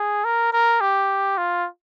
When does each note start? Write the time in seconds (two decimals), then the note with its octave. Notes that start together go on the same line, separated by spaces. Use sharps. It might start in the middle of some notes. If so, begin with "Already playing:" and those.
Already playing: G#4
0.24 A#4
0.53 A#4
0.81 G4
1.38 F4